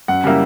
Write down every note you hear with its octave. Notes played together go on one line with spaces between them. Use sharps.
F#2 F#5
C#3 G3 A#3 E4